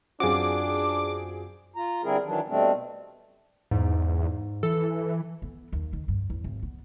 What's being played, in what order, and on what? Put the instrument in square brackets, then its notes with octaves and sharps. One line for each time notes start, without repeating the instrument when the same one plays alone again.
[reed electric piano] F#2 F4 F#4 [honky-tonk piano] C4 G#4 [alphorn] D4 [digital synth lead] D6
[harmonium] F4 A#5
D3 G3 C4 E4 G#4 A#4
D#3 E3 F#3 D4
B2 G3 A3 C4 D4
[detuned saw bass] E2 [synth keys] G#2
[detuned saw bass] E3 [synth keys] A4
[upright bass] B3
D#2
D#3
G2
E2
G#1
B3